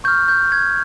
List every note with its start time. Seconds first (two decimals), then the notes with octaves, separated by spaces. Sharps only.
0.04 C#6 F6 G6
0.28 G6
0.52 G#6